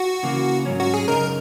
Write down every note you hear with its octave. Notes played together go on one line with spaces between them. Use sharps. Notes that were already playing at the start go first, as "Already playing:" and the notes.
Already playing: F#4
C#3 E3 A#3
G#2 F#3 C#4
F#4
G#4
F#2 C#3 G#3 D#4 A#4